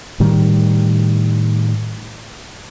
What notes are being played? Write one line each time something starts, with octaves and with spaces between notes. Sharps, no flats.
A2 D#3 G3